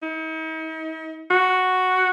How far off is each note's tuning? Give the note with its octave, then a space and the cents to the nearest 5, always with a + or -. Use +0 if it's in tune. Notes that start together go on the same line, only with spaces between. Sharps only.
D#4 +45
F#4 +0